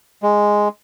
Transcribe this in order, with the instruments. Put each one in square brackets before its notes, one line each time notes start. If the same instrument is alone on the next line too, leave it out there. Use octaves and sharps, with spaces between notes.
[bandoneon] G#3